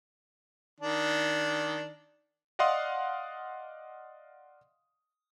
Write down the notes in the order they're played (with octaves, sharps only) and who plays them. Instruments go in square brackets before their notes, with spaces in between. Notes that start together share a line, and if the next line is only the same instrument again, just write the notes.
[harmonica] D#3 D4
[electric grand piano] D5 D#5 F5 F#5 C6 D#6